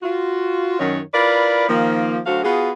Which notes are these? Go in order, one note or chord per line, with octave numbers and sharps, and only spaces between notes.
F4 F#4
F#2 D#3 C#5
E4 F4 A#4 B4 D5
D#3 F3 A#3
D2 F#3 F#4 A4 C5 F5
B3 F4 F#4 G#4